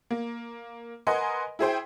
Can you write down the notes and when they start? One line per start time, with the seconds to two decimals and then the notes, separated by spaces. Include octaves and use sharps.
0.11 A#3
1.07 A#4 B4 D#5 F#5 G#5 C6
1.59 E4 G#4 C5 G5